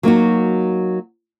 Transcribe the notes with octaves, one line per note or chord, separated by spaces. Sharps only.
F#3 A#3 D#4 F#4